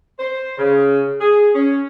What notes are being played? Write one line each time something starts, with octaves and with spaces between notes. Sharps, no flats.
C5
C#3
G#4
C#4